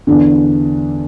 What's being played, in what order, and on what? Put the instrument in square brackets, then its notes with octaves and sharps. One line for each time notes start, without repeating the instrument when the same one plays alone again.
[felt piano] E2 D3 D4